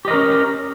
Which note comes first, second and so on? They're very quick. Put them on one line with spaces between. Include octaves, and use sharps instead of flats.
G4 D#5 A#4 C#4